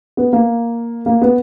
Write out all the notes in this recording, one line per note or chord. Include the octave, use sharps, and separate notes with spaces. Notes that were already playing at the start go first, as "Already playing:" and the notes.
B3
A#3
A#3
B3